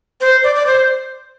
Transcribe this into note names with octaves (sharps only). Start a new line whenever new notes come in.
C5
D5
D5
C5